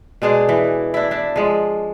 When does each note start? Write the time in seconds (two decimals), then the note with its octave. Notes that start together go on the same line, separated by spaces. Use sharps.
0.22 B2 G#3 D4 G#4
0.49 E3
0.94 D4 E4
1.11 D4 E5
1.36 F3 G#3